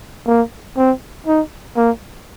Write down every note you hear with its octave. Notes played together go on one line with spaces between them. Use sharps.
A#3
C4
D#4
A#3